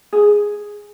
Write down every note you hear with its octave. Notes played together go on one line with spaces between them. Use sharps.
G#4